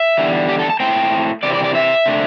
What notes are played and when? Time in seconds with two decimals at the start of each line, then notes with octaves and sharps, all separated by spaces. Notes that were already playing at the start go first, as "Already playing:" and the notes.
Already playing: E5
0.17 E2 D3 G3
0.49 G4
0.59 A4
0.70 A5
0.80 A2 A3 C4 G5
1.43 C3 E3 C4 D5
1.54 D5
1.64 D5
1.75 E5
2.05 C3 A3 D4